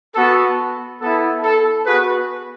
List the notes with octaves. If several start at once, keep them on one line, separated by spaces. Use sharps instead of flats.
B3 F#4 A4
B3 E4 A4
A4
B3 F#4 G#4 B4